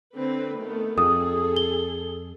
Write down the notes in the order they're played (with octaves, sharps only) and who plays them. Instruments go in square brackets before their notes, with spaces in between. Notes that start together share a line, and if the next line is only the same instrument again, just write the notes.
[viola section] D3 C4 B4
D#3 A3 B3
[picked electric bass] F2 [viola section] G#4 A4 [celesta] D#6
[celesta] G7